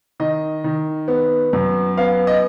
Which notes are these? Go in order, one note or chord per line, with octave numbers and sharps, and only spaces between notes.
D#3 D#5
D#3
B3
F#2
B3 F5
D#5